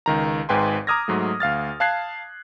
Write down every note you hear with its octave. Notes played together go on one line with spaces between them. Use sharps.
C#2 D#3 A#5
G#1 G#2 B4 G5 G#5 C6
A#5 D6 D#6 F6 G#6 A#6
G#2 F#3 A3
D2 F5 F6 A6
F5 A5 F#6 G#6 C7